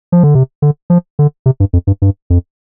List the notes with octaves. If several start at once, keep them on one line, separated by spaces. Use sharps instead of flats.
F3
D3
C3
D3
F3
D3
C3
G2
F2
G2
G2
F2